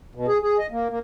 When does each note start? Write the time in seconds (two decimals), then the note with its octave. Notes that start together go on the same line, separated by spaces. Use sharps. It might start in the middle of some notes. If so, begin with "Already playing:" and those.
0.15 B2
0.28 G#4
0.42 G#4
0.59 D#5
0.71 A#3
0.89 A#3